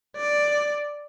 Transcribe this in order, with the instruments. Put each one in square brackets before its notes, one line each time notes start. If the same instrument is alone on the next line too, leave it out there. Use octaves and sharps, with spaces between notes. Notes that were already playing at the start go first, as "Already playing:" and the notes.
[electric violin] D5